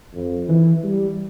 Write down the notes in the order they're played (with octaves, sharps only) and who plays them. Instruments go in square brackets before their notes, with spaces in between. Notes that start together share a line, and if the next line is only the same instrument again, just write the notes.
[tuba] F2
E3
G3